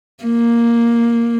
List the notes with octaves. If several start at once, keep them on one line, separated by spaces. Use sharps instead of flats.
A#3